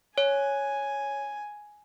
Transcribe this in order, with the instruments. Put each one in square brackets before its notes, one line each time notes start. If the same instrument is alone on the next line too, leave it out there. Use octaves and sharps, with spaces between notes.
[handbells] C#5 [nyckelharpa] G#5